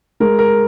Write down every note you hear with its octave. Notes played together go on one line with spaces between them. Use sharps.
G#3 A#4
A#4